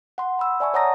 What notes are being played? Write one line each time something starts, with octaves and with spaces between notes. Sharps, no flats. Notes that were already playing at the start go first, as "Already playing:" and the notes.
F#5 C6
B5 E6
D5 E5 G#5 A5 C#6
C#5 F#5 A5 A#5 D#6 A#6